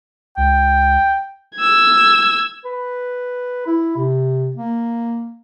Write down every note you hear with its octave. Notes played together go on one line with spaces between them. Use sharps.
C#2 G5
E6 G#6
B4
E4
C3
A#3